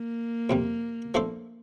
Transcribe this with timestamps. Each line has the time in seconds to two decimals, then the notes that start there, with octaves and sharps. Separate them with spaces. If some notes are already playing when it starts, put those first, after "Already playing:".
Already playing: A#3
0.50 F2 C3 G3
1.14 F3 A3 D4 A4 C5